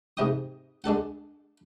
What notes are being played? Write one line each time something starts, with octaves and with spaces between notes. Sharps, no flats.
G#2 C3 D#5 G5 D#6
G#3 D4 A4 F#5